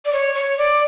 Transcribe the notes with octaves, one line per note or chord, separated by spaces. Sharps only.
D5
C#5
C#5
D5